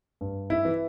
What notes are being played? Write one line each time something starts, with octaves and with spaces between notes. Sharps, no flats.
G2
E4
E3